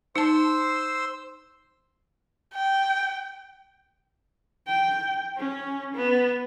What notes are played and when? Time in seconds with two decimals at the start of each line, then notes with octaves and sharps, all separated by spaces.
0.16 D#4 C5 A5 C6 E6
2.54 G5
4.67 G5
5.37 C#4
5.95 B3